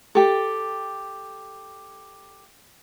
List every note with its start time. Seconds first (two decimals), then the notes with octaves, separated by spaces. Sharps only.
0.15 G4 A4